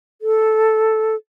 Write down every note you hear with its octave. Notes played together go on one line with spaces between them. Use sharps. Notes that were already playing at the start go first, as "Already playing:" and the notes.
A4